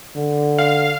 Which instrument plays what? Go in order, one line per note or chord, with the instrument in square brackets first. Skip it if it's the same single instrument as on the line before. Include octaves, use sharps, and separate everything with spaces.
[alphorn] D3
[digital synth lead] F5